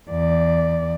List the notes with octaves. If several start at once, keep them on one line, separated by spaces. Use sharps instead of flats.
E2 D5